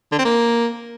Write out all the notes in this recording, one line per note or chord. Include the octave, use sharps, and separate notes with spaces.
D3
C4
A#3